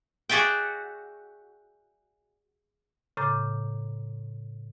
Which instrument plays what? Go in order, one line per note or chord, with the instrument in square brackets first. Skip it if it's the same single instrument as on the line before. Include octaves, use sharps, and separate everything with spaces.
[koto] F#4 G#4 D5 E5 G5
[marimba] A2 C#3 A#5 D6 G6 A6